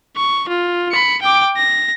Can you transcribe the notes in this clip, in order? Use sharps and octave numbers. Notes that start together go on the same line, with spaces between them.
C#6
F4
B5 C#7
G5 D6
A#6